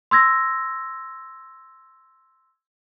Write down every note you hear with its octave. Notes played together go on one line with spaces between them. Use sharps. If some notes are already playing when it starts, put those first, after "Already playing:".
C6 E6 G#6 A#6